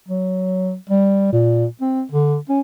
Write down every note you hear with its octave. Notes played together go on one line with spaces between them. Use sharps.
F#3
G3
A#2
C4
D3
C#4